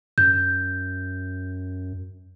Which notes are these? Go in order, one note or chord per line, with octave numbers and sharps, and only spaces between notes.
F#2 G6